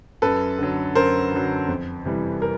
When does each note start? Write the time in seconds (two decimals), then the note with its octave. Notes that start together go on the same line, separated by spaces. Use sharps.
0.22 F#2 A4 B4
0.59 D3 F#3
0.95 F#2 A#4 C5
1.32 D3 F#3
1.68 F2
2.05 C3 E3 G3
2.42 A#4